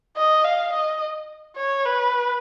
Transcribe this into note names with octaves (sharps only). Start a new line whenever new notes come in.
D#5
F5
D#5
C#5
B4